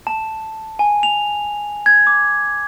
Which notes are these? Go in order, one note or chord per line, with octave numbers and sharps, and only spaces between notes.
A5
G#5
F7
G#6
D6